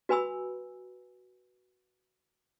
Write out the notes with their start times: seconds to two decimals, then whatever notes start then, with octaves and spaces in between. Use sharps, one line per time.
0.09 F#4 B4 G#5 B5 E6